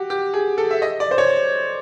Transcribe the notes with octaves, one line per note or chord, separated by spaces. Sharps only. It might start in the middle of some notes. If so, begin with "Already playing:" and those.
Already playing: F#4 G4
G4
G#4
A4
E5
D#5
D5
C5
C#5